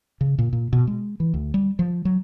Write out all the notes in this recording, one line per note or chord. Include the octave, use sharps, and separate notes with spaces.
C#3
A#2
A#2
B2
G#3
E3
D2
G3
F3
F#3